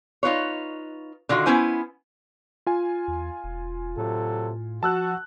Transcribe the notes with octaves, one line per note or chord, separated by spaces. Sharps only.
D#4 F4 B4 C#5
D3 D#3 F4 F#4
B3 C#4 E4 C5 G#5
F4 G#5
E2
E1
A2 C3 F#3 A4
F3 F#4 A5 E6 F#6